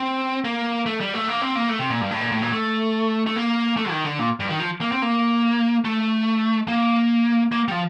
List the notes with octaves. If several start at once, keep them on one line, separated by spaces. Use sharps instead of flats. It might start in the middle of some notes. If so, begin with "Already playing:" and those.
Already playing: C4
A#3
A3
G3
A3
A#3
C4
A#3
A3
C3
A#2
G2
A2
A#2
A2
A#2
A3
A3
A#3
A3
D#3
D3
A#2
G2
D#3
F3
A#3
C4
A#3
A3
A#3
A#3
G3
F3